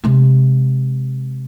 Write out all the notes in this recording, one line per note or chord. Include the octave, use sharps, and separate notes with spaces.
C3 G#3